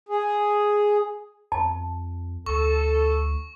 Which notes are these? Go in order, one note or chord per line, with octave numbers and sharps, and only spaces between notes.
G#4
F2 A5
D2 A4 C#6